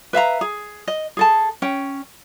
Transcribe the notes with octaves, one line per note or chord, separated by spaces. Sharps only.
B4 E5 F5 A#5
G#4
D#5
G#4 A4 A5
C#4 G5